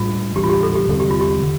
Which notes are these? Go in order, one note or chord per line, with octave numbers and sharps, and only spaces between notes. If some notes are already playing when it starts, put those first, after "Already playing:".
Already playing: A2 G3 D4 F4
A2 E3 G3 D4 G4
F4
G4
A4
G4
E2 D3 G3 C4 A4
G4
F4
G4
D3